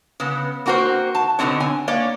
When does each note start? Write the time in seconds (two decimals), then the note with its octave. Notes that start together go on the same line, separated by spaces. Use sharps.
0.20 C#3 B3
0.66 A#3 C4 F#4 A#4 C5
1.15 A5
1.39 B2 D3 D#3 C4 C#5
1.60 G#5
1.88 A#3 C#5 D5